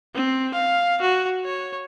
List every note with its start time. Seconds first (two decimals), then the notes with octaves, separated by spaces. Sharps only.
0.15 C4
0.54 F5
1.01 F#4
1.45 C#5